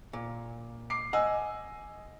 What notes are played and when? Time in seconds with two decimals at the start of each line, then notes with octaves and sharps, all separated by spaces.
0.13 A#2
0.90 D6 C7
1.13 D#5 F#5 G#5 E6